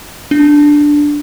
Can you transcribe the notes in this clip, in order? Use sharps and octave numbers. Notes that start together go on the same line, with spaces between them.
D4